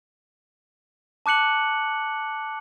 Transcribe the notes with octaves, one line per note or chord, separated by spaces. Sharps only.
A5 D6 F#6 C#7 F#7